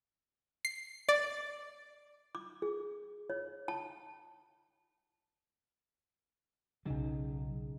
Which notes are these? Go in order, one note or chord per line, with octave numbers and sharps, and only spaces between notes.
C7
D5
D6
G#4
C#5
A5
B1 C#3 F#3 D#4